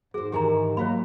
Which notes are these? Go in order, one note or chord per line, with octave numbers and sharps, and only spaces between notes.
G#2 F#4 G#4 C5
D#3 E3 E4 G4 G#5 A#5
F#3 A#3 F#4 C#5 F5 B5